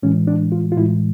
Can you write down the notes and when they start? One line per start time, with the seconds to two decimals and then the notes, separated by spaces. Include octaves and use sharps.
0.03 A2 E3 G#3 C#4
0.27 D4
0.52 F4
0.72 F4
0.76 A2 E3 G#3 E4